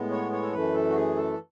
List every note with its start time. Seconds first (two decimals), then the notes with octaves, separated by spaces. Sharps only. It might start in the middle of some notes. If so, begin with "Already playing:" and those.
Already playing: A2 G#3 B3
0.11 C#5
0.32 C#5
0.43 A4
0.53 F#2 E3 A3 B4
0.74 A4
0.90 F#4
0.95 G#4
1.17 A4